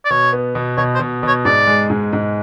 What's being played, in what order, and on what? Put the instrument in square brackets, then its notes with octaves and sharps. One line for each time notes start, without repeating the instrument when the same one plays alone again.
[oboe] D5
[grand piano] B2 [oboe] C#5
[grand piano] B3
B2
[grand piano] B2 [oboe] C#5
[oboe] C5
[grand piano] B2
B2
[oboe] C#5
[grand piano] G#2 [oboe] D5
[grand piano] G#3
G#2
G#2